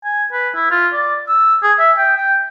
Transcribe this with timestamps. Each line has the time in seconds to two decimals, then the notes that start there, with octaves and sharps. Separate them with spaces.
0.05 G#5
0.33 B4
0.55 E4
0.71 F4
0.93 D5
1.29 E6
1.63 G#4
1.79 E5
1.98 G5
2.17 G5